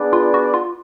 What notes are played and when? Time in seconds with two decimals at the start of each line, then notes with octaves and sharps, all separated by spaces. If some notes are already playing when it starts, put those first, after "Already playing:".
Already playing: B3 D4 G#4 B4 D5
0.13 F4
0.34 F#4
0.54 F4